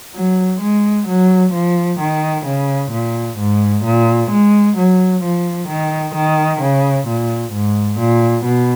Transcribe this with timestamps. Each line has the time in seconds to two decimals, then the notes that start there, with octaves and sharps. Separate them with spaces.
0.15 F#3
0.61 G#3
1.08 F#3
1.54 F3
2.00 D#3
2.46 C#3
2.92 A#2
3.39 G#2
3.85 A#2
4.31 G#3
4.78 F#3
5.24 F3
5.69 D#3
6.15 D#3
6.61 C#3
7.08 A#2
7.53 G#2
8.00 A#2
8.45 B2